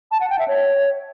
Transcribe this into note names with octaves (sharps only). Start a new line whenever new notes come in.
A5
F#5
G5
E5
C#5